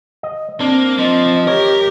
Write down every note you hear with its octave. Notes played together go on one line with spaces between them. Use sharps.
D#5
A#3 C4 D4
F3 C4 D#5
G4 A#4 C#5